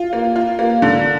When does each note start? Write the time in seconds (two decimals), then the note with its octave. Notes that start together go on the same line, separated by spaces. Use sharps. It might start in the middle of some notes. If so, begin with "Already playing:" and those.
Already playing: F4
0.13 A#3
0.36 F4
0.59 A#3
0.82 D3